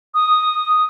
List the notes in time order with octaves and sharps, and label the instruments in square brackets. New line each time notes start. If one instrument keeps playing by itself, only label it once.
[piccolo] D#6